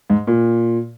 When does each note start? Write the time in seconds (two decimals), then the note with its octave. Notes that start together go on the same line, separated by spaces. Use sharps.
0.10 G#2
0.27 A#2